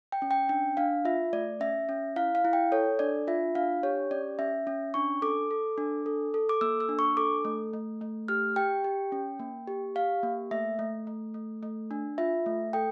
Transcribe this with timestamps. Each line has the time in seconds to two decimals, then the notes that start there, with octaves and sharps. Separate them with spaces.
0.12 G5
0.22 C#4
0.31 G5
0.49 D4 G5
0.77 D4 F5
1.05 F4 E5
1.33 A3 D5
1.60 C#4 E5
1.89 C#4
2.16 E4 F5
2.35 F5
2.45 E4
2.53 G5
2.72 A4 C#5
2.99 D4 D5
3.27 F4 E5
3.55 D4 F5
3.83 G4 C#5
4.11 C#4 D5
4.39 C#4 E5
4.67 C#4
4.94 D4 C#6
5.22 A4 D6
5.51 A4
5.78 D4
6.06 A4
6.34 A4
6.49 D6
6.61 A#3 E6
6.80 E6
6.89 D4
6.99 C#6
7.17 A4 D6
7.45 A3
7.73 A3
8.01 A3
8.28 G4 F6
8.56 G4 G5
8.84 G4
9.12 C#4
9.39 A#3
9.68 G4
9.95 G4 F5
10.23 A#3
10.51 A3 E5
10.79 A3
11.07 A3
11.34 A3
11.63 A3
11.91 D4
12.18 F4 E5
12.46 A3
12.73 A4 G5